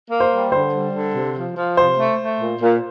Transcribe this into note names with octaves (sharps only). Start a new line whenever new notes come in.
A#3
C5
G3
D3 C5
G3
D3
C3
F3
F3
C3 C5
A3
A3
A#2
A#2